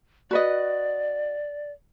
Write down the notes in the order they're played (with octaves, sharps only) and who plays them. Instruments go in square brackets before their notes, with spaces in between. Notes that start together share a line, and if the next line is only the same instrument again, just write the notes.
[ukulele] F#4 B4 D#5 [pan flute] D5